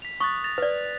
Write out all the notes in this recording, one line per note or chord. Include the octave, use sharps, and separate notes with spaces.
B6 F7
C#6 D#6 F#6 A6
A6 A#6 F7
B4 D5